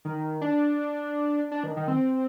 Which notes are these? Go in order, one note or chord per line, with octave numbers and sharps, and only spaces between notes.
D#3
D4
D4
D#3
D#3
C4